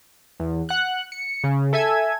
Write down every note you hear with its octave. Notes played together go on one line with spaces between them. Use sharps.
E2
F#5 F#6
C#7
C#3
A4 E5 G#5 G#6